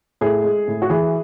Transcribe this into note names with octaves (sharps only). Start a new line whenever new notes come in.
A2 G#4
G#3
A2
F#4
E3 G#4